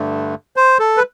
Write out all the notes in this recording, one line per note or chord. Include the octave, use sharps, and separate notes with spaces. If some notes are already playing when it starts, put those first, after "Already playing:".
Already playing: G2 D3 A3
C5
A4
B4